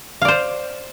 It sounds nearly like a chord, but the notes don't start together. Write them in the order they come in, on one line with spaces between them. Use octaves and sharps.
F5 D5 C5